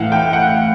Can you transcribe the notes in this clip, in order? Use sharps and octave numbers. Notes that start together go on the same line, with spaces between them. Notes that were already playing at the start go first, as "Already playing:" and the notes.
Already playing: A2 E3 F5 F#5
G5
F#5